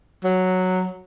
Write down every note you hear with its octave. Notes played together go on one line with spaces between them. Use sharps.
F#3